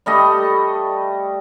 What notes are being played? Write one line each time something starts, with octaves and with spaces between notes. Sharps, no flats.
G3 A3 D#5